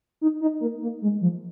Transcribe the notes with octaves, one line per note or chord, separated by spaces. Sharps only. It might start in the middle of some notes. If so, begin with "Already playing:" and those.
D#4
D#4
A#3
A#3
G#3
F3